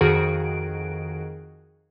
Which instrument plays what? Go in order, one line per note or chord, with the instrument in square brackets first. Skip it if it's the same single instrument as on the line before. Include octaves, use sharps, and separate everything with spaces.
[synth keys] F2 D#3 F#4 G#4 D7